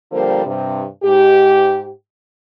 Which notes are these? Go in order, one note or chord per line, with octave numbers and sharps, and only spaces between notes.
D3 F3 G3 A#3 A#4 C5
G2 C3
G#2 G4